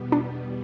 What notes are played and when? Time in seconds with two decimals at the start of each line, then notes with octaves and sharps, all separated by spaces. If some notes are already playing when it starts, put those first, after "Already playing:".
Already playing: E2 B2 G3 B3
0.12 D4